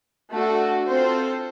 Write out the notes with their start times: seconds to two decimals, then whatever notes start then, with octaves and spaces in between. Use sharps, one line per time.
0.32 A3 D4 F#4 A4
0.87 C4 F4 A4 C5